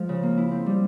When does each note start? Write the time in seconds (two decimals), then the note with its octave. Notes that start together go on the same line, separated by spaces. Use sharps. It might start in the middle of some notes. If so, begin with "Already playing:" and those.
Already playing: F3 G#3
0.09 C#3
0.23 A#3
0.37 E4
0.51 C4
0.66 G3